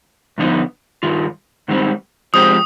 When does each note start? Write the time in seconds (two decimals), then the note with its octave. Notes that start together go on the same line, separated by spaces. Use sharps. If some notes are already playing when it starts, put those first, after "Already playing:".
0.38 G2 D3 F3 B3 D#4
1.03 G2 D#3 F4
1.68 G#2 D#3 G3 C4
2.34 F3 G#3 C4 G4 D#6